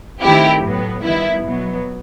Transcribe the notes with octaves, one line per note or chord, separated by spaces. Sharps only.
D#3 A3 C4 E4 G4
A2 F#3 B3
D#3 G3 B3 E4
B2 F#3 B3